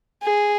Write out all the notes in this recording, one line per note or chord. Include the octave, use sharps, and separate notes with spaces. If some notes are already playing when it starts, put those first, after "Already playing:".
G#4